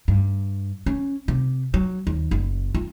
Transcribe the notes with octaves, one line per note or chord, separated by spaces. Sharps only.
G2
C#4
C3
F#3
D#2
F#1
F4